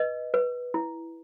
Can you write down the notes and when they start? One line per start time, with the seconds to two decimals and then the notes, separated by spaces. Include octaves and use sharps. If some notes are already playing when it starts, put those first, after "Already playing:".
Already playing: B4 D#5
0.34 B4
0.74 E4